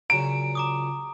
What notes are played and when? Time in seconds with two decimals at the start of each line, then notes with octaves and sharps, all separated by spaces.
0.10 A#2 C#3 F#3 A#5 D7
0.55 A#5 D6 D#6